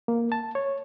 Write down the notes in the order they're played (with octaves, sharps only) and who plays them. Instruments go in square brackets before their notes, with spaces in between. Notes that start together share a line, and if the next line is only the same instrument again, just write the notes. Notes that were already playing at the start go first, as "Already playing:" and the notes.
[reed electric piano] A#3
A5
C#5